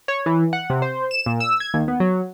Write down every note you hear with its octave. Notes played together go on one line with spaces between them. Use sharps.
C#5
E3
F#5
C3
C5
E7
A#2
E6
G#6
D#2
B3
F#3